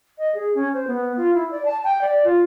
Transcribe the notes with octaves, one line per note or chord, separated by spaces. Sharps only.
D#5
G#4
C#4
C5
B3
F4
E4
D5
A5
G5
D5
F4